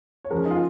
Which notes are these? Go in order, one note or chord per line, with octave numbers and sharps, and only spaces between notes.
C#5
C#3 F3 G#3 A#4
G#4
D#4
F4